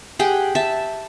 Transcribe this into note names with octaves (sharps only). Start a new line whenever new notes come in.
G4 G#4 F#5 G5
E5 A5